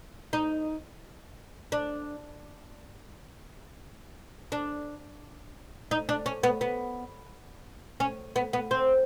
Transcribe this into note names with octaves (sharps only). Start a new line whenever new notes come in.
D#4
D4
D4
D#4
D4
C#4
B3
B3
C#4
B3
B3
C4